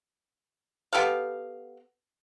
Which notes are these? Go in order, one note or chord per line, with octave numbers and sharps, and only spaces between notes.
B3 G4 A4 F5